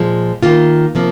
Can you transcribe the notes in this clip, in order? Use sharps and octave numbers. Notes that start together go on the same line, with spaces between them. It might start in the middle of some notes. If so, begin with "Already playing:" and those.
Already playing: A#2 F3 G#3
D#3 A#3 F4
C3 F3 A#3